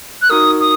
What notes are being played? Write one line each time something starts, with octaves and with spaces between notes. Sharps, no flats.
F#6
D#4 F#4 A#4 D#6
D#6